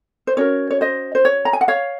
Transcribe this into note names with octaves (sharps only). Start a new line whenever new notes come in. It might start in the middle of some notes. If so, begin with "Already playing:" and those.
C5
C#4 F#4 A#4 C#5
C#5
C5 D#5
C5
C#5
A#5
G#5
F#5
C#5 F5